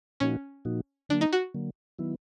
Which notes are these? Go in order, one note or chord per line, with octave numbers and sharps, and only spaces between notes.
A#2 F3 A#3 C#4 D#4 F#4
A#2 F3 A#3 D#4 F#4
D3 F#3 A#3 D4
D#4
F#4
D3 F#3 A#3
D#3 F#3 B3 E4